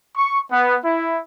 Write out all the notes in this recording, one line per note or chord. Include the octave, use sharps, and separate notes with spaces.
C#6
B3
E4